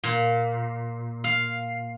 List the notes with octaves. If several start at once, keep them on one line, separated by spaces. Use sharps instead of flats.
A#2
F5